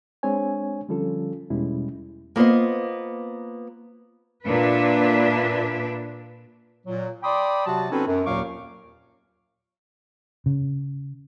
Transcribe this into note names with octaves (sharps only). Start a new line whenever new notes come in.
G#3 C4 D4 C#5 G#5
D3 F3 G3 C#4 F4 A4
E2 B2 G3 G#3 C#4 E4
A#3 B3 F4 C5 D#5
A#2 D4 B4 E5
A#2 F#3
D5 G5 B5 C6 D6 D#6
C3 F#3 F#4 A5
C4 C#4 D#4 F#4 A4 B4
F#2
D#2 A#2 F#3 F5 C#6 D6
C#3